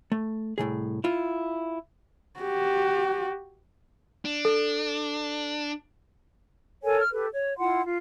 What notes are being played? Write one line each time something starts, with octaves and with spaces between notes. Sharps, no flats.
A3
C2 A2 C3 G#4
E4 F4
F#4 G4
D4
A4
A4 A#4 C#5 G#5
F6
G4 A4 B4
C#5
E4 F4 F#5 C6
F4